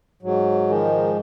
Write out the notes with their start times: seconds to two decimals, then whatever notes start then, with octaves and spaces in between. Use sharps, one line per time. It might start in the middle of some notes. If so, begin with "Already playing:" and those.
0.22 G#2 F#3
0.68 D#3 F3 G#3